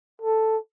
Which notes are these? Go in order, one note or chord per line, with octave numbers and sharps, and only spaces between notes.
A4